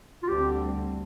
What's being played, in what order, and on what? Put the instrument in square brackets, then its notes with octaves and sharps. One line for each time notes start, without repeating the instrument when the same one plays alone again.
[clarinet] F4
[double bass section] D2 D3 G3 C4 [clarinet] G4